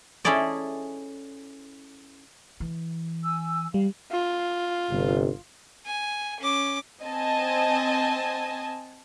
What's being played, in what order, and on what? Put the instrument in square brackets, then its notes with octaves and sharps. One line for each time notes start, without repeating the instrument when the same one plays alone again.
[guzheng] C#4 E4 G#4 A4 D5 D#5
[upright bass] E3
[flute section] G#5 E6
[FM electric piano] G3 [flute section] F5
[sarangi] F4
[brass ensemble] G1 C3
[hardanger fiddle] G#5
C#4 D6
[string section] C4 D#5 G#5 A5